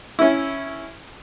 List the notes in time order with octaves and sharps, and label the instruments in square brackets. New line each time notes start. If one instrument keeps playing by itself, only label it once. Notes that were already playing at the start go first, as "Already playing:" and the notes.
[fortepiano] C#4 E4